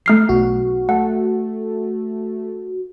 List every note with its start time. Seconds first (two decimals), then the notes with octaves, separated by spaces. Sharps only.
0.06 A3 F6 C7
0.29 B1 F#4
0.89 A3 F#5